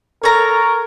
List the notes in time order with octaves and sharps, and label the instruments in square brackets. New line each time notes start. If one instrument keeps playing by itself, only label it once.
[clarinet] A4 [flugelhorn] A#4 [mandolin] C#5 A#5